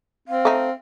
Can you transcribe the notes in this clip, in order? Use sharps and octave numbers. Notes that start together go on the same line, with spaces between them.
C4 F5
A3 D#4